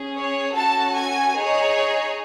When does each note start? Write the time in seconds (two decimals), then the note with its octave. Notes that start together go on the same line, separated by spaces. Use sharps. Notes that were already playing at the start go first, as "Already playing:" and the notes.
Already playing: C#4 G#4
0.16 C#5
0.55 C#4 F#4 A4 A5
0.95 G#5
1.35 D#4 G#4 C#5